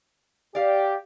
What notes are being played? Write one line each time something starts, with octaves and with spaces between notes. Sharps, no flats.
G4 D5 F5